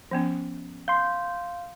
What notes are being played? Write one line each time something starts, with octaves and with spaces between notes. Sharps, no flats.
F3 B3 C#4
F5 C6 G6